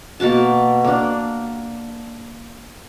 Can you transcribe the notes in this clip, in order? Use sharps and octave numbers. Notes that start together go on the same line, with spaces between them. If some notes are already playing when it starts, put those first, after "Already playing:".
B2 A#3 F#4 A5
A#3 D4